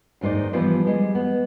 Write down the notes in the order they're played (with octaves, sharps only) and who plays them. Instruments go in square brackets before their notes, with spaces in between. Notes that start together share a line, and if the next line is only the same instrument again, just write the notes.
[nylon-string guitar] D#2 G#2 D#4 C5 D5
E3 F3 G3 B3
G3 G#3
B3